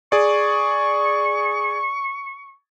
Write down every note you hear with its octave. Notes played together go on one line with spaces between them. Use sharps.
G#4 D5 C#6